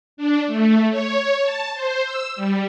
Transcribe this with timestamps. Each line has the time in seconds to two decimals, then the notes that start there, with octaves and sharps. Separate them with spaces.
0.17 D4
0.47 A3
0.90 C#5
1.42 A5
1.74 C5
2.05 E6
2.36 G3